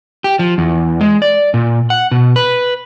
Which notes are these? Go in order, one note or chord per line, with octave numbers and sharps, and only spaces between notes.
G4
F3
E2
G#3
D5
A#2
F#5
B2
B4